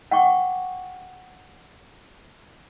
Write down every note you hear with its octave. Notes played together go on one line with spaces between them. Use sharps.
F#5 G5 C#6 D6